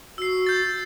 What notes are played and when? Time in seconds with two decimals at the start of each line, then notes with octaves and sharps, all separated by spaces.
0.18 F#4 E6 C7
0.46 G6 A6